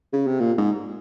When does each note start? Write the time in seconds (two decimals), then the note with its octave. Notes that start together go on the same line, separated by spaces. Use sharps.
0.13 C#3
0.27 C3
0.40 A#2
0.58 G#2